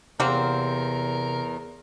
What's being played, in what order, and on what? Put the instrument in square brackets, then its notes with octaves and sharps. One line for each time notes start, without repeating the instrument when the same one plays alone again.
[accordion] E2 [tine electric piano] C3 [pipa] F#3 A#3 C4 [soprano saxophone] A#4